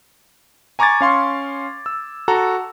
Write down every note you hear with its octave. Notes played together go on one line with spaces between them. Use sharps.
G#5 A#5 C#6 D6 G#6 A6
C#4 F5 C6 C#6
E6
F#4 A4 A#5